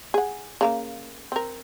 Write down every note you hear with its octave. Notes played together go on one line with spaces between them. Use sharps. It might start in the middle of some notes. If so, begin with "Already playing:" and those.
G#4 F#5
C#3 A#3 F5
C4 A#4